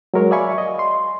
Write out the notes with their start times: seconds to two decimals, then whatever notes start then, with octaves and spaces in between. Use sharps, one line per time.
0.14 F#3 G#3 A#4 C#5
0.31 D5 E5 F5 G#5 B5 C#6
0.58 D#5
0.79 C6